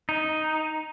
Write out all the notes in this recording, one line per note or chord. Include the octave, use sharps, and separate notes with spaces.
D#4